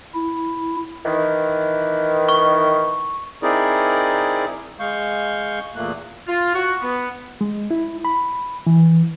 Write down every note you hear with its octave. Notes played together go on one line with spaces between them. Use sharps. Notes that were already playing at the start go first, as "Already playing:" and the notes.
E4
D#3 E3
C#6
C4 D#4 E4 G#4 A#4 D5
G#3 F5 C#6 G6
E2 A#2 A3 A#3 F#6
F4
F#4
B3
G#3
E4
B5
E3